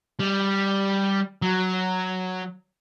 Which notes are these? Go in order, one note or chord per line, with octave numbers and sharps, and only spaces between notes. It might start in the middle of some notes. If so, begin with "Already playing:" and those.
G3
F#3